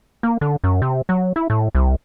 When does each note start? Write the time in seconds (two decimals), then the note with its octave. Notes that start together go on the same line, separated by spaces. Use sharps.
0.23 A#3
0.41 D3
0.64 F#2
0.82 C3
1.09 F#3
1.36 E4
1.50 A2
1.75 C2